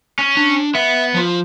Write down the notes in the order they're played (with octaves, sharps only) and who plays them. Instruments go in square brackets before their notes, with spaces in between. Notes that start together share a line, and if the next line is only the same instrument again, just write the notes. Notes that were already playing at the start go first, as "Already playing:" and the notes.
[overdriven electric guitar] C#4
[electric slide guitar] D4
[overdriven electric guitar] B3 [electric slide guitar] E5
[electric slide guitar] F3 F4